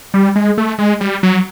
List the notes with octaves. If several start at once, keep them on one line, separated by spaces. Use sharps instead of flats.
G3
G#3
A3
G#3
G3
F#3